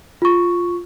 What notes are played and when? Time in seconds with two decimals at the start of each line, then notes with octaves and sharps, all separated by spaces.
0.22 F4 C#6